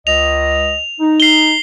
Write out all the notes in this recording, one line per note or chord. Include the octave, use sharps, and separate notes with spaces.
C#2 D#5 F7
D#4
C7 G7